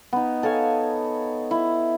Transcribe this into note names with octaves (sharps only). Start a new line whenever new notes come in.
B3 D#4
A4 C#5 F5 G#5
E4